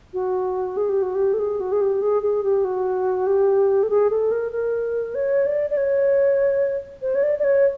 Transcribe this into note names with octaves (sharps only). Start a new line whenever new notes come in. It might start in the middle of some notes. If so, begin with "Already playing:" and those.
F#4
G#4
G4
F#4
G4
A4
G#4
F#4
G#4
G4
G#4
G#4
G4
F#4
G4
A4
G#4
A4
A#4
A#4
C#5
D5
D5
C#5
C5
C#5
D5
D5
C#5